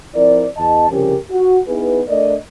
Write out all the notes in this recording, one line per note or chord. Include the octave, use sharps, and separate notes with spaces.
F3 C4 E4 A#4 D5
E2 D#5 A5
C2 C#3 F3 C#4 G4 A#4
F#4
B3 D#4 E4 G#4 B4
A3 D4 A#4 D5 D#5